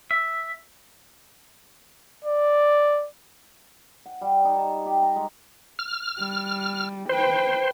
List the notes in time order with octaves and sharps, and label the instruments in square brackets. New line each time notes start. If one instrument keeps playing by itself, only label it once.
[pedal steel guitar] E5
[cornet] D5
[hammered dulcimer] F#5
G3
D#4
A5
G4
A#5
G#3
[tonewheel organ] F6
[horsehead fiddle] G3
[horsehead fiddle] B4 G5 [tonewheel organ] C5